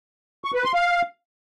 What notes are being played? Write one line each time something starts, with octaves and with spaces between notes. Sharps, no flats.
C#6
B4
C6
F5